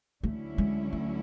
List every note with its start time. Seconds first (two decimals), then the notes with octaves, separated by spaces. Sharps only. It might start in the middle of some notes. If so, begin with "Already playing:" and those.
0.23 D2 D3 F#3 A3 C#4 E4
0.58 G#3
0.93 A3